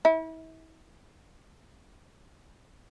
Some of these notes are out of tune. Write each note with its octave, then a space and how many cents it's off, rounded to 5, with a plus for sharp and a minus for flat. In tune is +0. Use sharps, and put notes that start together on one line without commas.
E4 -40